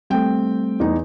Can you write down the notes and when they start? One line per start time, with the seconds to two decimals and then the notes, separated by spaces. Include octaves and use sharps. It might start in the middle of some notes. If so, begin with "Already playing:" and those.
0.10 G3 A3 C4 G5
0.80 E2 D#4